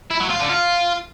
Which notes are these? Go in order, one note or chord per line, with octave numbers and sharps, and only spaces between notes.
E4
F#3
F4
D3
F4